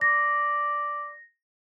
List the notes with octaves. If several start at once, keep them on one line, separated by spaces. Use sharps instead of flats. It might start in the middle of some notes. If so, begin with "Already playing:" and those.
D5 A#6